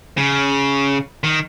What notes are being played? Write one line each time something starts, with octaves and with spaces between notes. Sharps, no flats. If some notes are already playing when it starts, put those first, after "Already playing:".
C#3
D#3